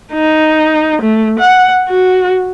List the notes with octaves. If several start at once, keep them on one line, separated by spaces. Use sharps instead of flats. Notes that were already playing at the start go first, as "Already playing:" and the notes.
D#4
A3
F#5
F#4